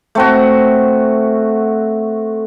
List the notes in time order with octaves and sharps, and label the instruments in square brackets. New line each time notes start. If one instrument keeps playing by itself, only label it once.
[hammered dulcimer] A3 C4 F#4